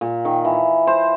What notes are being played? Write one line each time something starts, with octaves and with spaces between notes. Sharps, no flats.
A#2
D#3
E3
C5